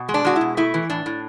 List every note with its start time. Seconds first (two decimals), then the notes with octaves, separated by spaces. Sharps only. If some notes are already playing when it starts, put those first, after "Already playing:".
Already playing: B2
0.09 G#3
0.14 D4
0.25 G#3 F#4
0.36 E4
0.41 B2
0.57 A3 E4
0.74 E3
0.90 A2 D4
1.06 A2